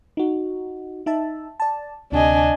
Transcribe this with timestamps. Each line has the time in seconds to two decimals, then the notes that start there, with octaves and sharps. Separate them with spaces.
0.17 D#4 F#4
1.06 D#4 E5 A5
1.60 D5 A5
2.12 D2 C3 D4 D#5 G#5